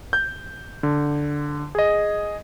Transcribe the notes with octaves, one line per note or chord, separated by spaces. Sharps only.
G6
D3
G#4 D#5